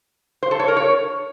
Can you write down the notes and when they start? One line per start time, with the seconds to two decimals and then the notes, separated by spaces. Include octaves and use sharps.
0.43 C5
0.51 A4
0.60 C#5
0.68 A#4
0.77 C#5